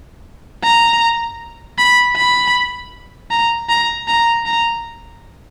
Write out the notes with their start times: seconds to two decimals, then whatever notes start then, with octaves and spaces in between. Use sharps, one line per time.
0.64 A#5
1.78 B5
2.17 B5
3.31 A#5
3.69 A#5
4.08 A#5
4.46 A#5